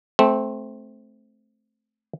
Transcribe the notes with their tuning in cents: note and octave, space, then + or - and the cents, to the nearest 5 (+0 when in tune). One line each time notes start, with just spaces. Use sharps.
A3 -20 C4 +0